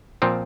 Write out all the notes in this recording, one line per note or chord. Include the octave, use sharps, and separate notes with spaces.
A#2 F3 C4